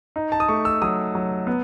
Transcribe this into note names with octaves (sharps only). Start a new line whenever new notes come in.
D#4
A5
D#6
A3 C#6
E6
F#3 D#6
F#3
B3